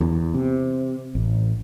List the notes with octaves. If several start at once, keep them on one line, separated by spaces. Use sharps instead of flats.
E2
C3
A1